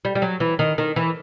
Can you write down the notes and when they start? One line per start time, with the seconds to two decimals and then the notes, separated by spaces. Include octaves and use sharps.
0.05 G3
0.15 G3
0.22 F#3
0.40 E3
0.59 D#3
0.78 D#3
0.96 E3